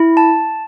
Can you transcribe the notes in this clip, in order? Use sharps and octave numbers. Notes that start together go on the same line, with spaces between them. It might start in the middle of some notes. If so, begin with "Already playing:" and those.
Already playing: E4
A5